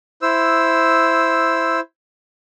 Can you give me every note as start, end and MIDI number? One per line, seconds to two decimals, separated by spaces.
0.22 1.80 64
0.22 1.80 72
0.22 1.80 88